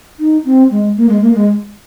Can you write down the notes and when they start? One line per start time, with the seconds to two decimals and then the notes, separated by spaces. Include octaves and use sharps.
0.20 D#4
0.45 C4
0.71 G#3
0.97 A#3
1.09 G#3
1.22 A#3
1.35 G#3